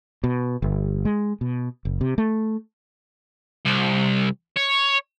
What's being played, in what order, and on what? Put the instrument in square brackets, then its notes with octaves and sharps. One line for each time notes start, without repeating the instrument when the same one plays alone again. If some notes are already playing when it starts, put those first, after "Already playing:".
[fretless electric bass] B2
G1
G#3
B2
F#1
C3
A3
[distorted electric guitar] C2
C#5